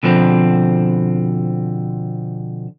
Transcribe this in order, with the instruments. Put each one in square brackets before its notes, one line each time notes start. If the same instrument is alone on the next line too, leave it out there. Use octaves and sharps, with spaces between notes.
[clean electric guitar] B2 D3 F3 C4